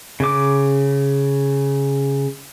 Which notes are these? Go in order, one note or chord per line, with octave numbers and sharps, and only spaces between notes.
C#3 D6